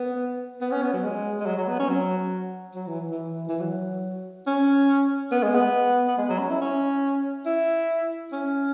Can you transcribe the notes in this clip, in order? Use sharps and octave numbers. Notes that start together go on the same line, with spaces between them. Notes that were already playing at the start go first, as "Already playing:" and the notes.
Already playing: B3
B3
C#4
B3
F#3
G#3
G#3
F#3
F#3
B3
C#4
F#3
F#3
E3
E3
E3
F#3
C#4
B3
G#3
B3
B3
G#3
F#3
C#4
E4
C#4
E4
C#4